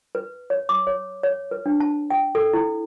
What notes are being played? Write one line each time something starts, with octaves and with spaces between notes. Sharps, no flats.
B4
C#5
D6
C#5
C#5
B4
D4
A5
G5
A4
E4